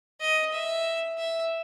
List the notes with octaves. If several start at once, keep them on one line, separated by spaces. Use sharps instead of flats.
D#5
E5
E5